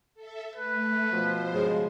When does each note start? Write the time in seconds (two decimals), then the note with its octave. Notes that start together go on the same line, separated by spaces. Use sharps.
0.14 A4 E5
0.56 A3 B4
1.12 B2 F3 C5
1.53 G2 C#3 G#3